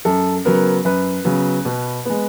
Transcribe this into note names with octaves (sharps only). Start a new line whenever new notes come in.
F#2 A4
C#3 F#3 B3 A#4
F#2 B4
C#3 F#3 B3
B2
G#3 B3